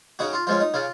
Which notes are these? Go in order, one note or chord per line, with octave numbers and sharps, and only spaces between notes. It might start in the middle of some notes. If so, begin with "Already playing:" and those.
C#3 D#4 F#4
F4
F3 G#3 C#4 F4
D#4
C#3 F4